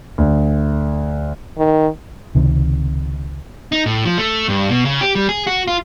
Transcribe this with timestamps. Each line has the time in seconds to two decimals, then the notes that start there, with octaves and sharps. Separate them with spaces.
0.18 D2
1.58 D#3
2.35 C#2 C3 D#3 C4
3.72 D#4
3.86 A2
4.05 F3
4.18 A3
4.49 G2
4.69 B2
4.85 C#3
5.01 G4
5.15 G3
5.29 G#4
5.47 F#4
5.68 F4